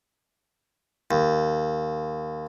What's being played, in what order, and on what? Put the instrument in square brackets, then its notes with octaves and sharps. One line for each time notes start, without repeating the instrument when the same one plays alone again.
[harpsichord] D#2